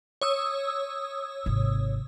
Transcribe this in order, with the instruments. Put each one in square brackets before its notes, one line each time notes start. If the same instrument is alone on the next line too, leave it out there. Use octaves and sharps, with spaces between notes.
[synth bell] C#5 D#6 E6
[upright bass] G#1 C3